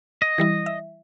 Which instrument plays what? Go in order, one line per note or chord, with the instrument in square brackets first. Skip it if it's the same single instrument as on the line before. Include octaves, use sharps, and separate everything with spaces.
[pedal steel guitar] D#5
[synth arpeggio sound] E3 G3 E4
E5